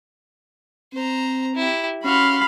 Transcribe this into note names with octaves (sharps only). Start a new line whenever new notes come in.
C4 C5 A#5
E4 G4
C#4 F#4 F5 B5 C6